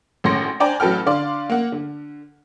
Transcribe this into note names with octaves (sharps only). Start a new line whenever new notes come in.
G#1 A2 C#4 C6 A#6 C#7
D4 C5 D5 G5 G#5 A#5
A1 F#3 A4 B4 G5 F6
D3 D5 F5 C6
A#3 F#5
D3